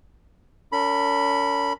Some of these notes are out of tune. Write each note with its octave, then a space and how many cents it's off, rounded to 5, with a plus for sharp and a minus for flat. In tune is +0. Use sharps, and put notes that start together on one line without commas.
C#4 +40 A#4 -45 B5 -5